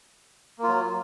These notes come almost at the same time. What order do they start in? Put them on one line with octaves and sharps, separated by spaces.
A#3 F4 F#3